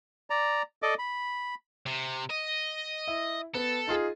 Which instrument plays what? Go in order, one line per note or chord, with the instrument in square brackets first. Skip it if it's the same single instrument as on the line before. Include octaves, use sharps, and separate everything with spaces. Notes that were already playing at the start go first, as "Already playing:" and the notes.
[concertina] D5 A#5
A4 D5 D#5 D6
B5
[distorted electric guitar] C3
D#5
[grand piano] E4
[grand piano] B3 [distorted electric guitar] A4
[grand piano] D#4 F4 G#4